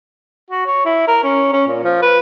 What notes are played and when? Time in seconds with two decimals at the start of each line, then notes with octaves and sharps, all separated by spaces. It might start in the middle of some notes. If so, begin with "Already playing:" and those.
0.50 F#4
0.66 C#5
0.85 E4
1.08 A#4
1.23 C#4
1.53 C#4
1.67 A#2
1.84 F3
2.02 B4